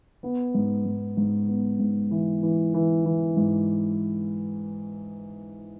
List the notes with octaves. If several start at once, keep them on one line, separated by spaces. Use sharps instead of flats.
B3
G#2
G#2
G#2
B3
G#2
E3
E3
E3
E3
G#2